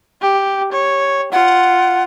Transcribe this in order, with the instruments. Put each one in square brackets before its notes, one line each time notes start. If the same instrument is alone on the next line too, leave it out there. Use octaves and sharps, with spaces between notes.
[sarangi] G4
C#5
[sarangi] F4 [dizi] F#5